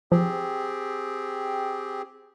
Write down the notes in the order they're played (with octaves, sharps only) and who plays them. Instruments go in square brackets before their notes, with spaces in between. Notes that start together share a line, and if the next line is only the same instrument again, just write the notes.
[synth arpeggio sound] F3 [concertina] C4 G4 G#4